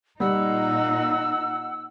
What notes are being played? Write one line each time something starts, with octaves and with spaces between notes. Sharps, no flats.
A#2 G3 D#4 F#5 E6